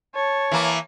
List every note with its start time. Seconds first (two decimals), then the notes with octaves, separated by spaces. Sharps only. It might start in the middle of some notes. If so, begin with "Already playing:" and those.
0.14 C#5 A5
0.51 E3 A#3